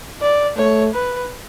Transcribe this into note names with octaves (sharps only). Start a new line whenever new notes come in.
D5
A3 C#5
B4